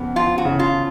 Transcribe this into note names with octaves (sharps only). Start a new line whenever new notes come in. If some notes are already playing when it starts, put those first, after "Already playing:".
Already playing: F2 C#3 B3
F3 F4
F#4
C#3
F4